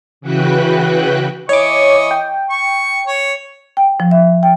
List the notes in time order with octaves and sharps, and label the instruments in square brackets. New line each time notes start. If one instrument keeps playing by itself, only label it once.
[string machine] C#3 E3 F#4 B4 G5 F#6
[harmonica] E3 D#5 C#6 [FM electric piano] C#5 D6
[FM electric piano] G5
[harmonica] C#6
C#5
[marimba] G5
F3
E5
G5